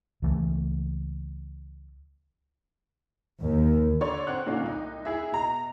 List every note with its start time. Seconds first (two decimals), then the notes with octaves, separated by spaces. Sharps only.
0.22 C#2 E3 A3
3.42 D#2
4.01 D3 C#5 D5 C6
4.27 C4 F#5 F#6
4.46 A#2 D3 C#4 D#4 F4
4.63 C2 D#4
5.05 E4 G#4 E5
5.32 B2 A#5